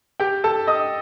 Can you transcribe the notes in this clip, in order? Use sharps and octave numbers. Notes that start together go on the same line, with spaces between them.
G4 G5
A4 A5
D#5 D#6